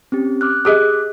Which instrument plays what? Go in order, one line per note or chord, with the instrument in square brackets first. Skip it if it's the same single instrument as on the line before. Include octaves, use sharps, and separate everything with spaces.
[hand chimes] C4 C#4 G4
D6 F6 F#6
[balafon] G4 G#4 D#5 [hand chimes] D6 F#6